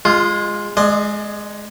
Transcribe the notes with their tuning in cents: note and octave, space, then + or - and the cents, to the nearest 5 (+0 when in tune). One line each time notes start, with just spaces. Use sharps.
G#3 -15 F4 +0
G#3 +10 D5 +45